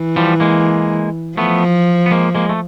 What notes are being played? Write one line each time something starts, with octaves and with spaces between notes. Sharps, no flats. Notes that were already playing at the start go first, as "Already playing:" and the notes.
Already playing: E3
F3 G3
G#3 A#3
F3 A3 B3
B3
G#3 A#3
G#3 A#3
A3